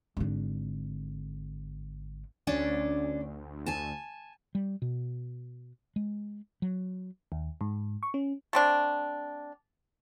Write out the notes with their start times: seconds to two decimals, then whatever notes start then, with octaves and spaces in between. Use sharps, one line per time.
0.17 G#1 D3
2.47 D2 C#4 D4 D5
3.66 G#5 A5
4.55 G3
4.82 B2
5.96 G#3
6.62 F#3
7.32 D#2
7.61 G#2
8.03 C#6
8.14 C#4
8.53 A3 C4 D4